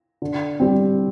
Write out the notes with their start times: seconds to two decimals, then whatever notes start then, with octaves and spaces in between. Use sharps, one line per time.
0.22 D3
0.60 G3 C4